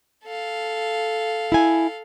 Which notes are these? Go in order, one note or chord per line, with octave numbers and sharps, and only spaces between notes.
A4 F5
E4 G#5